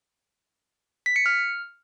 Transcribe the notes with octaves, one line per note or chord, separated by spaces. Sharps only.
B6
C#7
F6